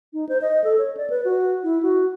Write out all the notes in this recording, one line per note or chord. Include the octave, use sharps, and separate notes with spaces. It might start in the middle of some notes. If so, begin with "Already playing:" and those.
D#4
C5
D#5
A4
C#5
D5
B4
F#4
E4
F#4